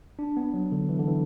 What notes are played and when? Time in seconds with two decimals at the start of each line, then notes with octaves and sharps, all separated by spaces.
0.19 D4
0.37 B3
0.54 F#3
0.72 D3
0.89 E3
0.99 D3
1.07 E3